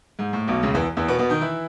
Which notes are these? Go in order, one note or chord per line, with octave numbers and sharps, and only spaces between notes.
G#2
A2
B1 B2
C#2 C#3
E2 E3
E2 E3
B2 B3
B2 B3
D#3 D#4
E3 E4